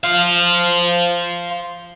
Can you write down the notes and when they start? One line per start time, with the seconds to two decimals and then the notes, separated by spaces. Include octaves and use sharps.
0.04 C5 F5